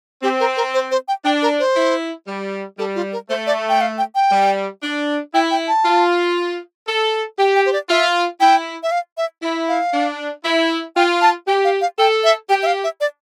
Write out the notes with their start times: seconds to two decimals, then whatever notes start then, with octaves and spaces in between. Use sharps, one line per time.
0.23 C4 G4
0.40 A#4
0.57 A#4
0.74 C5
0.91 C5
1.08 G5
1.25 D4 G5
1.42 A#4
1.59 C5
1.76 E4
2.27 G3
2.78 G3 A4
2.95 F4
3.13 A#4
3.29 A3 C5
3.47 D5
3.69 G5
3.81 F5
3.98 G5
4.15 G5
4.31 G3
4.83 D4
5.34 E4 G5
5.51 G5
5.68 A5
5.85 F4
6.87 A4
7.39 G4 G5
7.55 G5
7.66 C5
7.73 D5
7.90 F4 E5
8.40 E4 G5
8.83 E5
8.91 F5
9.17 E5
9.43 E4
9.68 F5
9.94 D4
10.45 E4
10.96 F4 G5
11.22 A5
11.47 G4 G5
11.64 F5
11.81 F5
11.99 A4 G5
12.24 E5
12.49 G4 G5
12.63 E5
12.67 F5
12.84 E5
13.00 D5